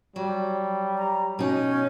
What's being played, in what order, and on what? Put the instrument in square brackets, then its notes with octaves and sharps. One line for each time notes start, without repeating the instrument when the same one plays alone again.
[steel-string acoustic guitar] F#3 [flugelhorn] G3
[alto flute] A#5
[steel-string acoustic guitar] B2 D#4 [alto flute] C#4